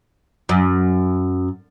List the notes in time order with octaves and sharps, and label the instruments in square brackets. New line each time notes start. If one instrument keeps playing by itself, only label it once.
[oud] F#2